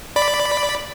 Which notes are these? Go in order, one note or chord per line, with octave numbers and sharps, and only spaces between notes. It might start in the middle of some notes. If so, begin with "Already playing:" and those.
D5 B5